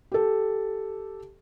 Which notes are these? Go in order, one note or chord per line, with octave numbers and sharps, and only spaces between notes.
G4 A4